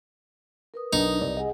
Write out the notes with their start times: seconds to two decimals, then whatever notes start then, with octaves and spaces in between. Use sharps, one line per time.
0.74 A#4 B4 D#6
0.93 B1 D4 D#4
1.21 C2 D5
1.37 G#4 D#5 F#5 G#5